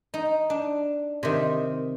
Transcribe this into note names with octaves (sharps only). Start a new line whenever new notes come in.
D#4
D4
C3 D#3